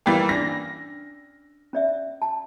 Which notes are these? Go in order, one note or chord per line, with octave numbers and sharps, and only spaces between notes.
E3 G3 A#3 G5
C#4 D4 D5 A#6
C#4 D5 E5
A5